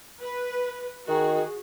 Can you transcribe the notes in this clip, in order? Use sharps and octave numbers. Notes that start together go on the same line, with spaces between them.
B4
D#3 F#4 G#4